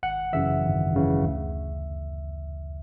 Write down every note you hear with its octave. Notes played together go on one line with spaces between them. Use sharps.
G#1 F#5
F#2 C#3 E3 E5
G#1
F#2 C#3 E3
D2